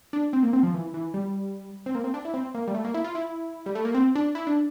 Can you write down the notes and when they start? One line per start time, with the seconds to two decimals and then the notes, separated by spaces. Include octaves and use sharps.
0.13 D4
0.33 C4
0.43 A#3
0.53 C4
0.63 F3
0.74 E3
0.94 E3
1.14 G3
1.86 C4
1.95 A#3
2.04 C4
2.14 D4
2.25 E4
2.34 C4
2.55 A#3
2.67 G3
2.75 A3
2.85 A#3
2.94 E4
3.04 F4
3.15 E4
3.66 G3
3.75 A3
3.85 A#3
3.94 C4
4.15 D4
4.35 E4
4.47 D4